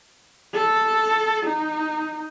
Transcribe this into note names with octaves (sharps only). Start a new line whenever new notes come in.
A4
D#4